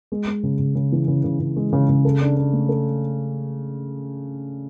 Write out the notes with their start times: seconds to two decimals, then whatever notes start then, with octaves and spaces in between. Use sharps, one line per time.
0.12 G#3
0.27 G#3
0.43 C#3
0.59 C#3
0.75 C#3
0.92 E3
1.08 C#3
1.24 C#3
1.40 C#3
1.56 G#3
1.73 C#3
1.89 C#3
2.05 A4
2.21 D4
2.37 D4
2.53 A3
2.69 A4